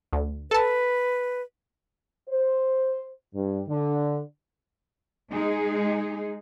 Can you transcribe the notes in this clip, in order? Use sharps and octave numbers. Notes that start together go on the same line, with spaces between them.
D2
A4 B4 A5
C5
G2
D3
G#3 D#4 G#4